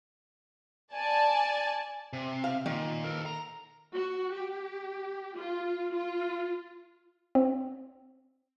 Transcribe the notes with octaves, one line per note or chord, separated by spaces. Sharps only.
D5 G#5 A5
C3
F5
A#2 D#3
A4 A#4
A#5
F#4
G4
F4
F4
C4